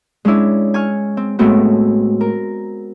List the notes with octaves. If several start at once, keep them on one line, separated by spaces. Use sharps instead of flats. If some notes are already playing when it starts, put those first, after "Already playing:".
G#3 C#4 D4 E4
G#5 C#6 F6
C4
A2 G#3 A3 B3 C4 F#4
A#4